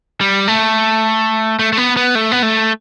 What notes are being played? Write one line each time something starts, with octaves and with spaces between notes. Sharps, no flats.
G3
A3
A3
A3
B3
B3
A3
B3
A3